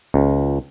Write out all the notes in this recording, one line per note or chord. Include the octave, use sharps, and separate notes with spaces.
C#2